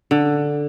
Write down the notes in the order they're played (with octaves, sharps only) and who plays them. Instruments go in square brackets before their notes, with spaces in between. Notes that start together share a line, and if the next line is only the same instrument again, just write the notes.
[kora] D3